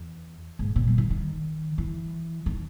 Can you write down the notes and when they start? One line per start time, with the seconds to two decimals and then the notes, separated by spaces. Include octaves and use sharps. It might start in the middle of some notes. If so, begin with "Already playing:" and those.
Already playing: E2
0.59 G#2
0.76 A#2
0.87 G3
0.98 D#3
1.10 D#3
1.78 E3
2.46 D#3